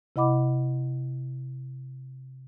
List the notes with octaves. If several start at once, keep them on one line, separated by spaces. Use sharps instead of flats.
C3 E4 D#5 F#5 B5 D6